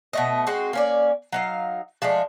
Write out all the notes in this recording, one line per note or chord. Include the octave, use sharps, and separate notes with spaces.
B2 A3 D#5
G#3 C4 F#4
A#3 C#4 D5
F#3 D#4 F5
F3 G#3 A3 D4